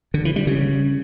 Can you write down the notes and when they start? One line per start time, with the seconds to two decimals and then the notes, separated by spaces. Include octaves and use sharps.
0.14 D3
0.25 E3
0.36 G3
0.47 C#3